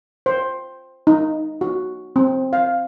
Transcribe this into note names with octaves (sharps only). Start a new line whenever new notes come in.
C5
D#4
F#4
C4
F5